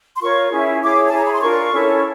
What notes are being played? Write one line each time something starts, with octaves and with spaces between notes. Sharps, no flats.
C6
F4 A#4 C#5 C#6
C#4 E4 G#4
E4 G#4 C#5 D6
A5
E4 G#4 C#5 A#5
B5
C6
D4 F4 A#4 C#6
C#4 E4 A4 C#5